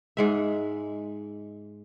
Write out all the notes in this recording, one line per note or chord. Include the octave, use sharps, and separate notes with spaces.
G#2 G#3 E5